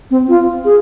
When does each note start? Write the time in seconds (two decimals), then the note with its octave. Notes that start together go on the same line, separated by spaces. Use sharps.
0.11 C4
0.29 F4
0.65 G#4